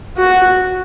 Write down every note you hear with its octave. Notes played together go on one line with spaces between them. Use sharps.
F#4